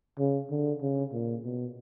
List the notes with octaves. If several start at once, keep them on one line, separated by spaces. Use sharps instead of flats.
C#3
D3
C#3
A#2
B2